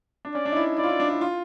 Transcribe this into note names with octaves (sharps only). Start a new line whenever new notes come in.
D4
C#4 D5
D4
D#4
E4
E4 D5
F4
E4
D4
E4
F4